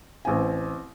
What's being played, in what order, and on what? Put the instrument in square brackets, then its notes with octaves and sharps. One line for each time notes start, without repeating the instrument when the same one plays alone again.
[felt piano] A1 C4 G#5